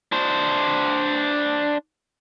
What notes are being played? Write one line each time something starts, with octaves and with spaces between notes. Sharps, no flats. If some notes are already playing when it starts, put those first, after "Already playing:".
D4 C5